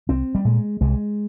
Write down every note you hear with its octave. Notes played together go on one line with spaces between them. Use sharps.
C2 C4
G3
A#2 G#3
C2 G#3